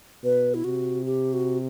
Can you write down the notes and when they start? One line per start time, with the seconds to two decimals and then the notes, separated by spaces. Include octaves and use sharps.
0.23 B2 B4
0.54 E4
0.64 C3 F#4
1.06 G4
1.33 F#4